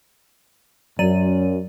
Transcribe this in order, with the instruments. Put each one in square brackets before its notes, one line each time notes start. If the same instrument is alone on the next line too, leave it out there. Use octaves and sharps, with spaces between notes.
[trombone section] F#2 [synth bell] F#3 D5 D#7